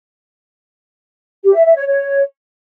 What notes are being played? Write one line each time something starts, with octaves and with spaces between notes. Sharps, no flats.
G4
E5
E5
C#5
C#5